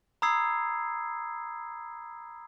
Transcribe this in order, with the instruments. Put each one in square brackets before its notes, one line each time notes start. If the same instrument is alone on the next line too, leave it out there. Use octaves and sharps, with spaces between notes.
[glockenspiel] A#5 B5 D#6 E6 G#6 C7